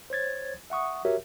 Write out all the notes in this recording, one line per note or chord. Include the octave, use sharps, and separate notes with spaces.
C5 C#5 G#6 A6
E5 F#5 C#6 D#6
F#4 G4 A#4 C#5 E5